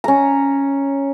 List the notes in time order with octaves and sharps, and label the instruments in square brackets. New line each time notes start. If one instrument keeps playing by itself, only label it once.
[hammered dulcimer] C#4 A#5